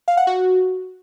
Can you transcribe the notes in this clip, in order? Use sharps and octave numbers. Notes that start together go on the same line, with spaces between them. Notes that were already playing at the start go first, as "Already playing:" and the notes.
F5
F#5
F#4